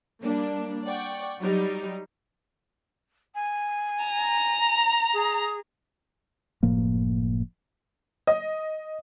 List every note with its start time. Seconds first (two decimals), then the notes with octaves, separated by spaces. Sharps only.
0.23 G3 A#3 D4
0.85 D5 F#5 G5 C#6
1.40 F#3 G3 D#4 G4
3.34 G#5
4.04 A#5
5.13 G#4
6.63 F#1 A2 F3 A#3
8.27 D#5